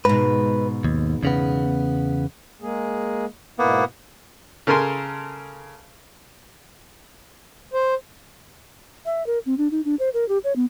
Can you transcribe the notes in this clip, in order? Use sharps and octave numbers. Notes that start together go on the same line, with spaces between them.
G#2 B2 B4
D#2
E2 C#3 B3
G#3 A#3 G#4
G#2 B2 A#3 B3 E4
C#3 A4 A#4 G#5 C6
C5
E5
A#4
C4
D4
D#4
D4
C5
A#4
G4
C#5
B3